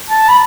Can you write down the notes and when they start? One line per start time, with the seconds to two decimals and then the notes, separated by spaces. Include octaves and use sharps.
0.10 A5
0.29 B5